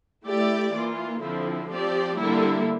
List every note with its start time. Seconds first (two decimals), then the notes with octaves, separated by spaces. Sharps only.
0.24 A3 E4 G4 D5
0.73 E3 A#3 F4
1.21 D3 F3 C4 E4
1.69 F3 C4 G4 D5
2.17 D3 G3 A#3 E4